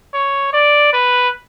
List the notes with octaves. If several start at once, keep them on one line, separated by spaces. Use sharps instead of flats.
C#5
D5
B4